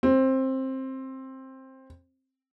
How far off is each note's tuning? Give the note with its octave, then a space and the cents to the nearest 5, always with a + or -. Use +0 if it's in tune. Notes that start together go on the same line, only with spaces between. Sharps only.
C4 +15